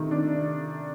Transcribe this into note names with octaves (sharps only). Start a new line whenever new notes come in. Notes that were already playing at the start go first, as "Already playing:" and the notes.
Already playing: C3 D#3 A3
D4